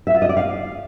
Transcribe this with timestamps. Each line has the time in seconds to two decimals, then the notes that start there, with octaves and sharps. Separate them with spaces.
0.07 E5
0.14 F4
0.22 D#5
0.29 D5
0.37 F5